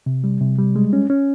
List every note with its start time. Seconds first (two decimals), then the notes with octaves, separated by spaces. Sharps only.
0.06 C3
0.24 G3
0.41 C3
0.58 G3
0.76 G#3
0.93 C#4
1.10 C#4